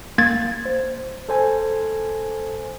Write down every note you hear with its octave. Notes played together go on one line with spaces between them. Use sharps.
A#3 G#6 A6
C5
A4 C5 G#5